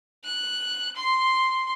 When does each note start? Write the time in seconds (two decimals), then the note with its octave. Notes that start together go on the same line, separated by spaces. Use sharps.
0.24 F#6
0.96 C6